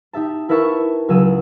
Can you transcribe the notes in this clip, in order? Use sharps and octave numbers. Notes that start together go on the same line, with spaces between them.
D#4 G4 E5 A5
E4 A#4 B4 E5 A5 C#6
C#2 F#3 G#4 E6 D#7